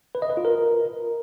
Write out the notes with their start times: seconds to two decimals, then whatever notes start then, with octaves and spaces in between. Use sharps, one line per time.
0.15 B4
0.22 D#5
0.30 B4
0.37 F4
0.45 A#4